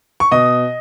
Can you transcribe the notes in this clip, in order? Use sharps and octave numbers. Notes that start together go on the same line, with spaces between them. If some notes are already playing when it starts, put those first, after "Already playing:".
C#6
B2 D#5 D#6